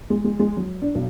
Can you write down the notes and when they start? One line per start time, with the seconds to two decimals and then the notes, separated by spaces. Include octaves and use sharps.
0.10 G#3
0.24 G#3
0.39 G#3
0.57 F#3
0.82 D4
0.95 B1